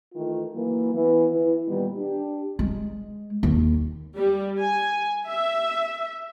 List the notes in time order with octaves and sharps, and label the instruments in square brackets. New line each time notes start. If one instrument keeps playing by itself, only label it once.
[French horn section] D#3 E3 A3 F4
E3 F#3 A#3
E3 B3
E3
A#2 D#3 G3 B3
D4 G4
[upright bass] G#3
D#2
[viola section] G3
G#5
E5